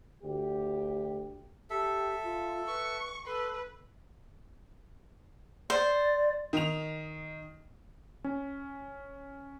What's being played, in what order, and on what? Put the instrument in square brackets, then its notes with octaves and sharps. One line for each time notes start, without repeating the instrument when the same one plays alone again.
[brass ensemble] D2 G4
[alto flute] G4 [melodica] A4 E5
[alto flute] F4
[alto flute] B4 [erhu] C#6
[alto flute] A4 [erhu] B4 [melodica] C6
[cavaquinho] C5 [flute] D5
[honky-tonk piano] D#3 F7
[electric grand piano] C#4